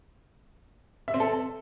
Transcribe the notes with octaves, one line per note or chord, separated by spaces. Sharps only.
E5
C4
A4